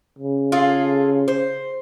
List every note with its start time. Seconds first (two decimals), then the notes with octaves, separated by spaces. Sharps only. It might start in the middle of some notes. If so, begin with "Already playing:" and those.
0.19 C#3
0.52 F4 G#4 A4
1.28 C5